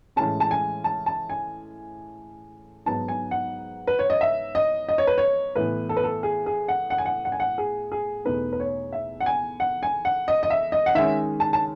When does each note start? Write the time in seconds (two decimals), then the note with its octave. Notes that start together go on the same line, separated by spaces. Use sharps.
0.16 A2 E3 G#3 C#4 A5
0.40 A5
0.51 G#5
0.84 A5
1.06 A5
1.29 G#5
2.86 G#2 F#3 B3 D#4 A5
3.08 G#5
3.31 F#5
3.87 B4
3.99 C#5
4.10 D#5
4.21 E5
4.55 D#5
4.89 D#5
4.98 C#5
5.07 B4
5.18 C#5
5.55 A2 E3 B3 B4
5.89 A4
5.97 B4
6.04 A4
6.23 G#4
6.46 G#4
6.68 F#5
6.90 F#5
6.98 G#5
7.06 F#5
7.25 F#5
7.32 G#5
7.40 F#5
7.58 G#4
7.92 G#4
8.25 E2 B2 A3 D#4 B4
8.53 B4
8.60 C#5
8.93 E5
9.20 F#5
9.26 G#5
9.60 F#5
9.83 G#5
10.05 F#5
10.28 D#5
10.43 D#5
10.50 E5
10.72 D#5
10.86 F#5
10.95 D#3 G#3 C#4 E5
11.40 A5
11.53 A5